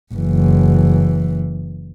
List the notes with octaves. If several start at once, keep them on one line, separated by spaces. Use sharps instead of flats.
F#1 E3